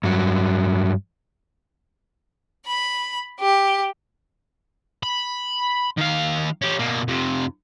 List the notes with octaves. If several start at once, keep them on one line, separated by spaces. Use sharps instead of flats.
G2 F#3
B5
G4
B5
D#3 F5
C#4 G4
B2 A#3
F2 C3